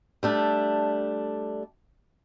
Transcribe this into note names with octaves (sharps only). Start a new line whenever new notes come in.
G3 A3 D4